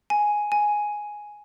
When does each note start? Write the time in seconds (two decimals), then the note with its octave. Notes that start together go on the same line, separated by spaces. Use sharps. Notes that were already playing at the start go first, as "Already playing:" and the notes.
0.10 G#5
0.52 G#5